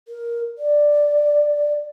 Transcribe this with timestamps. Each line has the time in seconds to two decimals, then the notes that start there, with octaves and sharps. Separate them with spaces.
0.08 A#4
0.58 D5